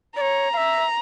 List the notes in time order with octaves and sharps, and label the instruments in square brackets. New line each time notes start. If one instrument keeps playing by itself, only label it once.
[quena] C#5 D5 [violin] A#5
[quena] F5
E5